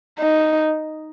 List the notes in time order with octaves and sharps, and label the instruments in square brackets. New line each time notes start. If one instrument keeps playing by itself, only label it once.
[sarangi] D#4